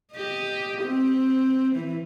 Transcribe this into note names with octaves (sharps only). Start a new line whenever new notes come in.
G4 D#5
C4
E3